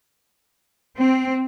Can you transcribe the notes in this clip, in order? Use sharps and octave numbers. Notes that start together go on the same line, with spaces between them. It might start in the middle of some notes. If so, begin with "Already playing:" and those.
C4